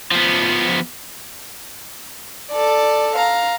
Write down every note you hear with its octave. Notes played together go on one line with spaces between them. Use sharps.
F3 B3
A4 D5
F5 A#5